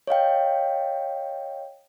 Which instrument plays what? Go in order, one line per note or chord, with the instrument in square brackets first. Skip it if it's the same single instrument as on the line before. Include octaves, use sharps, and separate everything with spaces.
[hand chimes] C#5 D#5 F5 G5